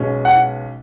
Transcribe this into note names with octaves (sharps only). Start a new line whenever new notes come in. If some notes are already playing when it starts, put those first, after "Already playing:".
Already playing: B1 B2 G#3 C#4
F#5